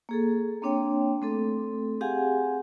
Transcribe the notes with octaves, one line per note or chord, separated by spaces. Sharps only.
A#3 G#4 A4
A#3 C4 D4 C#5 G5
A3 C4 A4
C4 G4 G#4 F5 F#5 G#5